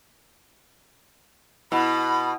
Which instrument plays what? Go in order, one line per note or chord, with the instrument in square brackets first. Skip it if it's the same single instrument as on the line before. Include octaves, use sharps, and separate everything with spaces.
[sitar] B2 [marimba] E4 F#5 [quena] B5